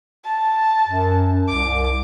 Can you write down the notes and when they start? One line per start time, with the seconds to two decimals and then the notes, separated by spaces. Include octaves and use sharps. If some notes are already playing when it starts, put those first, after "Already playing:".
0.25 A5
0.88 F#2
1.49 C2 D6